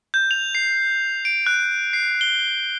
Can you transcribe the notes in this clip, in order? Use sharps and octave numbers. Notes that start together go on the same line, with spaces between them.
G6
F7
C7
D7
F#6
C7
G7